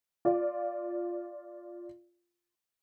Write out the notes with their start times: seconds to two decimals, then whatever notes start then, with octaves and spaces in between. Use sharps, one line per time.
0.25 F4 D5